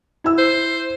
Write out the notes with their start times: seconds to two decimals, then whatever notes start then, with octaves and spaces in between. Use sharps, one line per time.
0.24 E4 E6
0.38 C5